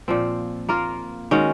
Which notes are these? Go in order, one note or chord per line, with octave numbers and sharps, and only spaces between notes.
A#2 F3 C4
A#3 F4 A#4
D#3 G#3 C#4 F#4